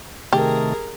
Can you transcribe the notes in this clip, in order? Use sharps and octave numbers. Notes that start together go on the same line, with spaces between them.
C3 D#3 A3 G4 G#4 A#4